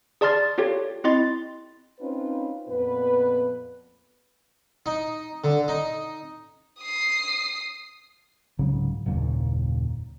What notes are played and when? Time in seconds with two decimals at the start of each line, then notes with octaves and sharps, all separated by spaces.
0.21 G#4 D5 A5 C6 F6 A6
0.58 F4 G4 A4 C#5
1.04 C4 E4 D#5 C6 A6
2.00 C4 C#4 D#4 F4 B4 C5
2.68 F2 A#2 B3 B4
4.86 D#4
5.44 D3
5.68 D#4
6.81 D#6 C7
8.59 C2 G#2 C#3 F#3
9.06 F#1 D#2 A#2